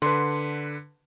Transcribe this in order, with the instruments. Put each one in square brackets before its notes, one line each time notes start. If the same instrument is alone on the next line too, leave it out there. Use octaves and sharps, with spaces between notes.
[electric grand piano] D3 B4 [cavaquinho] C6